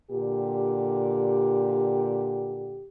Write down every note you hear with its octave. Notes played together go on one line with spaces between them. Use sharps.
A#2 D3 G4